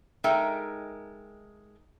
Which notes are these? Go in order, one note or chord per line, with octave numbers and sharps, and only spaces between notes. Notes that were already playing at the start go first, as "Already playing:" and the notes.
G#3 D#4 A4 A#4 E5 G5